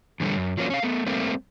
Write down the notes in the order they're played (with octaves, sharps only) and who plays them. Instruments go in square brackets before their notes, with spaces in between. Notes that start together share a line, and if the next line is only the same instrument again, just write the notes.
[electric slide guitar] E2 B2 D3 G3 A4
F#2
F3 F#3 A#3 C#4
C#4 F5
A3 B3
G3 A3 A#3 C4